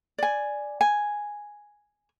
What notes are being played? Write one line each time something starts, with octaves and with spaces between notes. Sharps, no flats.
D5 G#5
G#5